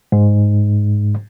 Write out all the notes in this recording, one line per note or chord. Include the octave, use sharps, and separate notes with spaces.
G#2